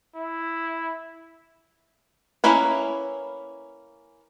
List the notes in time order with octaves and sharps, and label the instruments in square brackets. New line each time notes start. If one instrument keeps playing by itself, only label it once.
[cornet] E4
[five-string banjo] A#3 C#4 E4 B4